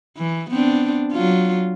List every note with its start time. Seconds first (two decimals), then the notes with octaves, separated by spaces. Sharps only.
0.17 E3
0.51 B3 C4 D4
1.12 F#3 F4